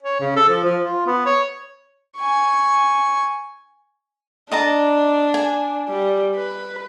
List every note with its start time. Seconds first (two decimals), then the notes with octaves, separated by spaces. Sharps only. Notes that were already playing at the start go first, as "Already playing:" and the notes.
0.03 C#5
0.20 C#3
0.36 A4
0.49 F3
0.64 F3
0.83 F4
1.07 B3
1.26 C#5
2.17 G#5 C#6
4.52 D4 D#5 A5 A#5
5.34 G#5
5.89 G3
6.35 B4